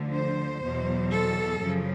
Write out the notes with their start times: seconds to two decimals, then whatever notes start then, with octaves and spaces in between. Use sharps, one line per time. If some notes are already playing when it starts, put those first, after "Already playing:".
Already playing: D2 D3 F3
0.13 C5
0.63 E2 B2 F#3
1.12 A4
1.62 F#2 C#3 F3